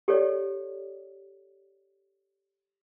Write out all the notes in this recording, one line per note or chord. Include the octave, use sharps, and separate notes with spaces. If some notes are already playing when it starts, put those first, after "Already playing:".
G4 A4 C#5 D5